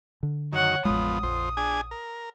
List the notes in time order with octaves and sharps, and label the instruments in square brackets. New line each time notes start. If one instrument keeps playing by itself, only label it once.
[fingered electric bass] D3
[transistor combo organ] F#2 D#3 [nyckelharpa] C#5 F#5
[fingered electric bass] A1 G#3 [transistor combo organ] F2 F3 B3 [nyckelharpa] D#6
[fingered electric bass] A#1 [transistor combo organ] F2 C5
[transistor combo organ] D4 G#4 G#5
A#4